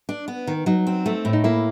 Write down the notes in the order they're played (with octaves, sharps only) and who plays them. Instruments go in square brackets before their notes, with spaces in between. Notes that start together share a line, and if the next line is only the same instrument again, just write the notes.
[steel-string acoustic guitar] D4
B3
D#3
[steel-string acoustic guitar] F#3 [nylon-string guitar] D#4
[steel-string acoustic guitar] C4
A3
A2
[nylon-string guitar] D#4
[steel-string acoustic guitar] A#3 [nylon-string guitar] E4